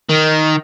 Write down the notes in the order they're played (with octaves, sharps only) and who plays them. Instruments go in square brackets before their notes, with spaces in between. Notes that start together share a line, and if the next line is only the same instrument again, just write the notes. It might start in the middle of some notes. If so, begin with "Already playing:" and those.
[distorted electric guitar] D#3